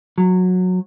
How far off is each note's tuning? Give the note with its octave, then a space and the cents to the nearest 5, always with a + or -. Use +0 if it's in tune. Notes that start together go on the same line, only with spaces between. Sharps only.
F#3 -15